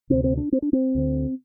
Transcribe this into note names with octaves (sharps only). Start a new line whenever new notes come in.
D2 C3 C4
C4
D4
C4
D4
C4
D2 D3